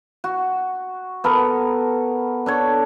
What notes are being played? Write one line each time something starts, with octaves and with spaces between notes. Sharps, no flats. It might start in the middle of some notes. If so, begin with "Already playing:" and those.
F#4
B3 A4 A#4
D4 A4 C#5